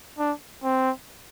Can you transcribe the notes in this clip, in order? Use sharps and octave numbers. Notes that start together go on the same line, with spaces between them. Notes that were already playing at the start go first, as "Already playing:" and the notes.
D4
C4